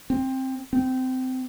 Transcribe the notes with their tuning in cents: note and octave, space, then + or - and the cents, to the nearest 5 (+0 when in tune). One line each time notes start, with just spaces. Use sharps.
C4 +10
C4 -20